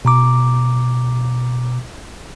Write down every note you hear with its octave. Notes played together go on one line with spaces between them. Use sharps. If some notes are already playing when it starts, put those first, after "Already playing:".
B2 A#5 D6